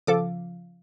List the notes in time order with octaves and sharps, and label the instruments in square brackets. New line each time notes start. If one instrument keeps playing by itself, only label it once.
[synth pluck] C#3 F3 F5 [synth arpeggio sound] A4 D6